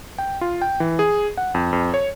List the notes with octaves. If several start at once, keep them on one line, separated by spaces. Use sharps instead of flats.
G5
F4
G5
E3
G#4
F#5
F2
F2
C#5